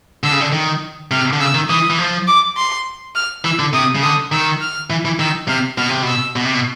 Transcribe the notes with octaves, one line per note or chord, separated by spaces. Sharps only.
D3 E6
C#3
D3
D#3
C3 F6
D3
C#3 E6
D#3
E3 D#6
E3
F3
D6
C6
F6
E3 E6
D3
C3 D#6
C#3
D3 D#6
D#3 E6
F6
E3
E3
D#3 E6
C3 F6
B2 F6
C3
B2 E6
B2
C3
B2